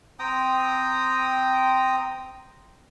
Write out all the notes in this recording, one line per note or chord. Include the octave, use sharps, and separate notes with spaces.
C4 G5 A#5 D#6